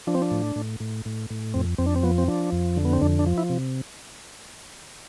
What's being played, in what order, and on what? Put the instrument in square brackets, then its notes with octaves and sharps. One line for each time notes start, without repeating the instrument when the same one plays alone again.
[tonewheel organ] F3 D4
C4
D4
A2
A2
A2
A2
A2
F2 C4
F2 C4
D4
C4
F3 B3
C4
F3 D4
F2
D3
B3
C4
F2 D4
D4
F3
E4
C3